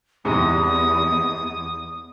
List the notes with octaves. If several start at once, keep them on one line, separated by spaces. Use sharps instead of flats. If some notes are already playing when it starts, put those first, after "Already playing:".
E2 G#2 C3 G#3 D#6